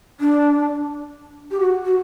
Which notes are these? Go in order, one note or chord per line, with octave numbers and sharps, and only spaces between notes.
D4
G4
F#4
F#4